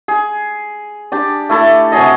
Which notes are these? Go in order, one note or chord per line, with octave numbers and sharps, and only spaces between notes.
G#4
D4 G4 D5
A3 E4 A4
C3 F#3 G#4 D#5